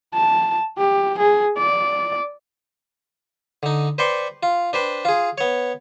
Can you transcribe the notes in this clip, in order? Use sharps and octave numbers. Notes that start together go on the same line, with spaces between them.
A5
G4
G#4
D5
D3 D#4
B4 C5 D5 G5 C6 C#6
F4
D4 B4 C5 G5
F4 G#4
B3 C#5